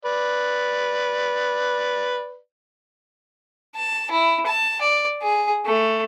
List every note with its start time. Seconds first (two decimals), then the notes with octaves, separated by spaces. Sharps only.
0.05 B4 D5
3.75 A5
4.11 E4
4.46 A5
4.82 D5
5.22 G#4
5.65 A3